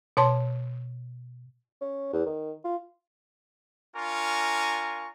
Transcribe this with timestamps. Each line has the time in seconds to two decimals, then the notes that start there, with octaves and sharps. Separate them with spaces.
0.17 B2 C#5 A5 C6
1.81 C#4
2.13 E2
2.26 D#3
2.65 F4
3.95 D4 F4 A#4 G#5 C#6